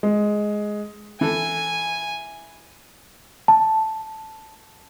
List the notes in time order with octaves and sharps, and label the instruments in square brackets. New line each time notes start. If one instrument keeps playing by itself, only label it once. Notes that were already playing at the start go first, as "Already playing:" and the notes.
[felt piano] G#3
[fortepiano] E3 A4 [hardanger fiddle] G#5
[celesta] A5